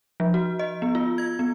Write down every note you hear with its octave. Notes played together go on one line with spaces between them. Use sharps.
F3
F#4
D#5
B3
F4
G#6
B3